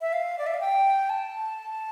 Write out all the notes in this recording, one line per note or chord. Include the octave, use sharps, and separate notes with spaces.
E5
F5
D5
E5
F5
G5
A5